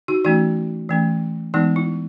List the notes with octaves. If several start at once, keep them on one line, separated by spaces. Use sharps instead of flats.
D#4 F#4
E3 A3 C#4 D#4 F#4
E3 A3 C#4
E3 G#3 B3 D#4
E4